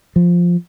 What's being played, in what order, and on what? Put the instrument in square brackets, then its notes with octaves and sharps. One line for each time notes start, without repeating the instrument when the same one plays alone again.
[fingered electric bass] F3